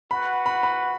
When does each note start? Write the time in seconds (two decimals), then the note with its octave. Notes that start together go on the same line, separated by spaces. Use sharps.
0.11 F#4 B4 F#5 B5
0.46 B5
0.63 B5